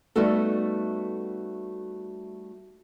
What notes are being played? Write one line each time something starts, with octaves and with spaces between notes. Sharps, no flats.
G3 A3 B3 D#4 F#4 A4